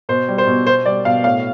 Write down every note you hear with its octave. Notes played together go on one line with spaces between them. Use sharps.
B2 C5
G3
C5
B2
B2 C5
G3 D5
B2 F5
A2 F5